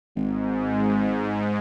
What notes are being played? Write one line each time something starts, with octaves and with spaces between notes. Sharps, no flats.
G#1 G#2